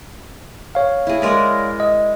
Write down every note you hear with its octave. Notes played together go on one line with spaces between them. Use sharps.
C#5 F5
E4 G#4
G#3 A#4 D5
D#5